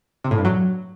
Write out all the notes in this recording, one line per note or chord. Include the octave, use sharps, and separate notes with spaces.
C3
A2
G2
F#3